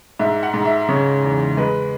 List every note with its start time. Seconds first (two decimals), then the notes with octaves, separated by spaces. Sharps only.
0.19 G#2 E5
0.43 F#5
0.54 G#2
0.65 E5
0.89 C#3 C#5
1.23 E2
1.57 G#3 B4